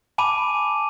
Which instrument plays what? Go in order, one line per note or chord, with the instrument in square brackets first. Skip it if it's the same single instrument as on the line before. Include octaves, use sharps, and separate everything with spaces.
[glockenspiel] G#5 A5 B5 D6 D#7